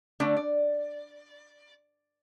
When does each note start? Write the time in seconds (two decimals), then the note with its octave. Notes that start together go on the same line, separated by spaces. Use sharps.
0.20 D3 A3 D4
0.36 D5